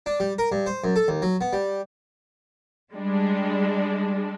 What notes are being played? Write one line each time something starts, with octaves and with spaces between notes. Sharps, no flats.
D4
G3
A#4
G2
C5
F#2
A4
D#2
F#3
B3
G3
G3 G#3 D4